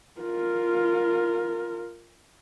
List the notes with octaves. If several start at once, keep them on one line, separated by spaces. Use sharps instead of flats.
F4 A#4